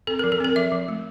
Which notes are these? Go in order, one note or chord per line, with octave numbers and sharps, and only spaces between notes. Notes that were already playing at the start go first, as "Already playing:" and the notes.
C4 A4
F3 A#4
A4
C4 A#4
F3 E5
F3
A3